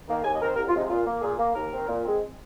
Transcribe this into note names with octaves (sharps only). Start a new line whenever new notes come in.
D#3 A#3
D#2 G#5
D#5
D#3 C4 A#4
C5
C2 A#4
F4
C3 F3 G#3 D#4
A#2 F4
A#3
A#2 G#4
A#3
D#2 A#4
D#3 C4
A#2
G#3 C4